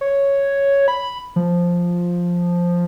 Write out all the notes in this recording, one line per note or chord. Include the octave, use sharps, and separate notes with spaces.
C#5
B5
F3